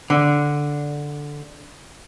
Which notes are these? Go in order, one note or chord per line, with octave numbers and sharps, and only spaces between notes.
D3